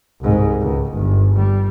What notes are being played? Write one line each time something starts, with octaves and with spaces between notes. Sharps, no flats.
C2 G#2
C#2 G#2
G1
G3